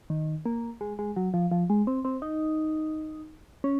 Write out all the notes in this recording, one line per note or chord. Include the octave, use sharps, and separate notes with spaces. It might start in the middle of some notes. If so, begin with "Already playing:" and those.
D#3
A#3
G#3
G#3
F#3
F3
F3
G#3
C4
C4
D#4
C#4